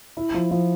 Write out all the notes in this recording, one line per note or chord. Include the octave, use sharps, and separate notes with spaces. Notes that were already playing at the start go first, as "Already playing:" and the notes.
E4
F3
F3